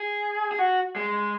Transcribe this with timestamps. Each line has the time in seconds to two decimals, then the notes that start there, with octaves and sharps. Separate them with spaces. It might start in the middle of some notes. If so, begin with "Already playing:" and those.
Already playing: G#4
0.52 G#4
0.59 F#4
0.96 G#3